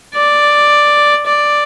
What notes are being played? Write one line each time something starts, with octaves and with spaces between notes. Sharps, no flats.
D5
D5